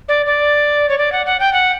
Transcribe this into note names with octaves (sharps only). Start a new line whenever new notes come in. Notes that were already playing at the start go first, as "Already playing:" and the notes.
D5
D5
C#5
D5
F#5
F#5
G5
F#5